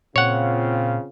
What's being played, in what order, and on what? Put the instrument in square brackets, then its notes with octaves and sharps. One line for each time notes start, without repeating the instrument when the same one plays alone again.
[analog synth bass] A#2 [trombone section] C#3 C4 F4 [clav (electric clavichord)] C#5 F#5